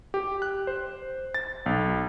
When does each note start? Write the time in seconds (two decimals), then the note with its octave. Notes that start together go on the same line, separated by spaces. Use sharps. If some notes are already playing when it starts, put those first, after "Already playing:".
0.14 G4
0.42 F#6
0.67 C5
1.34 A6
1.66 B1